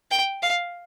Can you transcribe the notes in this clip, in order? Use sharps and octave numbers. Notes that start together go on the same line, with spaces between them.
G5
F5